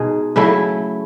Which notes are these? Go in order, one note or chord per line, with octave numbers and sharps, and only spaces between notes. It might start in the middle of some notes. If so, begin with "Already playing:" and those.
Already playing: B2 G#3 D#4 G#4
C#3 F#3 A3 E4